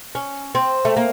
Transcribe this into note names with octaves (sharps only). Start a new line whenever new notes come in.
C#4
C4
A3
A#3